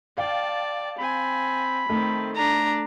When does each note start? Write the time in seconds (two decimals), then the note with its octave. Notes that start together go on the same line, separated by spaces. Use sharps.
0.18 D5 F5 G5 A5
0.99 C4 G#5 B5
1.90 D#3 A3 C4
2.36 D4 A#5